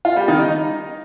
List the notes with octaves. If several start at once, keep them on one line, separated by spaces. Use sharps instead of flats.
F4
G3
D#3
D#4